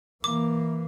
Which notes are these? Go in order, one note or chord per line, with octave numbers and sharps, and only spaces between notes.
E3 A#3 D6